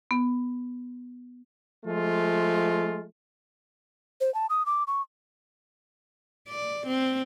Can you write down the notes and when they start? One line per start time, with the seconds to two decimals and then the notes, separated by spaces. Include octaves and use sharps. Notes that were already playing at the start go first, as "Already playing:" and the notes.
0.11 B3
1.85 F3 G#3 A3 F4
4.21 C5
4.34 A5
4.50 D#6
4.66 D6
4.87 C#6
6.48 D5
6.87 C4